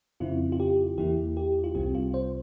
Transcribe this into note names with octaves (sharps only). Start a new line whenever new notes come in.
F2 C#3 F3 C4 E4 F4
F4
G4
E2 E3 A#3 E4 G4
G4
F4
C2 C3 G3 C4 G4
F4
C5